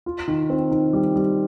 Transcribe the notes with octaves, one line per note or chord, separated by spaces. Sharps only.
F4
D#3
C4
D#3
G3
G3